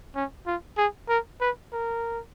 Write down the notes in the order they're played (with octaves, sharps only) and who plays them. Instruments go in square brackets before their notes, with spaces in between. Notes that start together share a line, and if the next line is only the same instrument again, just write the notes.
[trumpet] C#4
F4
G#4
A#4
B4
A#4